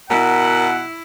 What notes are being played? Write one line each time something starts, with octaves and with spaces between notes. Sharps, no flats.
B2 E4 A#4 F#5